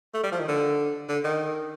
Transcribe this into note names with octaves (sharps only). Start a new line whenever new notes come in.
A3
G3
F3
D#3
D3
D3
D#3